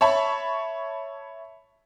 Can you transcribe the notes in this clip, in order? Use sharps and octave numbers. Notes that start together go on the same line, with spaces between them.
C#5 E5 A5 B5 C#6